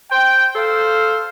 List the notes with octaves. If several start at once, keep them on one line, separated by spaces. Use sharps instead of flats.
C5 G5
A4 C5 F5